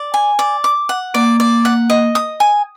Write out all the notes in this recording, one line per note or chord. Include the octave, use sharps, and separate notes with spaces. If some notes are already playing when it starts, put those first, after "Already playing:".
Already playing: D5
G#5
D5
D6
F#5
A#3 D5
D5
F#5
D#5
D#6
G#5